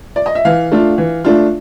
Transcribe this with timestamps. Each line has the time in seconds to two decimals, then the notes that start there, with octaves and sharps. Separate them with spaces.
0.16 D5
0.26 D#5
0.35 E5
0.45 E3 F5
0.72 A3 D4 F4
0.98 E3
1.25 A3 D4 F4